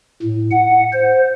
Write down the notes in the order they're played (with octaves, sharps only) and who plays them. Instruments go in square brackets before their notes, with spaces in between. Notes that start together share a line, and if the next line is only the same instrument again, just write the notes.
[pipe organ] A2
F#5
C5